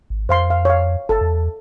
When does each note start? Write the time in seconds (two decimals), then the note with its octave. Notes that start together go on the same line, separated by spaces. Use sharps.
0.10 G#1
0.29 F2 C5 F5 C6
0.50 F5
0.65 C#5 F5
1.09 G1 A4 A5
1.21 E2